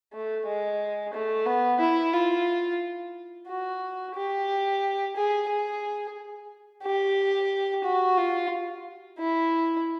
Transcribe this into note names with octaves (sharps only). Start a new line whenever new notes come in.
A3
G#3
A3
B3
E4
F4
F#4
G4
G#4
G#4
G4
F#4
F4
E4